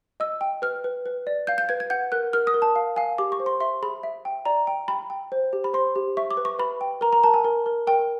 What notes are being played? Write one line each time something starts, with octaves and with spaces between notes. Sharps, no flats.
D#5 E6
G5
B4 F6
B4
B4
D5
F5 G6
G6
B4 G#6
G#6
F#5 G6
A#4 F#6
A#4 F6
D#6
A#4
A5
F5
F5 G#5
G4 D6
C#6
C5
C6
E5 C6
G#4 B5
E5
G5
D5 A#5
G5
G5 B5
G5
C5
G4
B5
C5 C6
G4
E5 C#6
D6
B4
C#6
B4 B5
G5
A#4 A#5
A#5
A#4 A5
G#5
A#4
A#4
A#4 G5